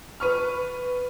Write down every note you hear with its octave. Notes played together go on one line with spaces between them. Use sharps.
B4 C#6 F6